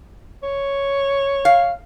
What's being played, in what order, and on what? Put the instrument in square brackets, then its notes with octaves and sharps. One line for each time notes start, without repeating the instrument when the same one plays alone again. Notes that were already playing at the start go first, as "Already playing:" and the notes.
[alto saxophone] C#5
[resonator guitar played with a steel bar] F5